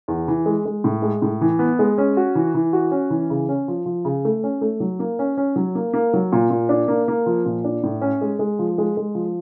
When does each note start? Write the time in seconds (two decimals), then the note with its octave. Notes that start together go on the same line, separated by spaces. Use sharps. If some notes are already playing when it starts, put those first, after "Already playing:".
0.08 E2
0.28 E3
0.46 G#3
0.66 G#3
0.84 A2
1.02 G#3
1.22 A2
1.41 E3
1.59 B3
1.79 G#3
1.98 C#4
2.17 F#4
2.35 E3
2.54 E3
2.73 F#4
2.91 C#4
3.10 E3
3.30 C#3
3.49 C#4
3.68 F3
3.86 F3
4.05 C#3
4.25 A3
4.43 C#4
4.61 A3
4.80 F#3
4.99 A#3
5.19 C#4
5.37 C#4
5.56 F#3
5.75 A#3
5.94 A#3
6.13 F#3
6.32 A#2
6.50 A#2
6.69 D4
6.88 A#3
7.08 A#3
7.26 F3
7.45 A#2
7.64 D4
7.84 A2
8.01 C#4
8.21 G#3
8.39 G#3
8.59 F3
8.78 G#3
8.97 G#3
9.15 F3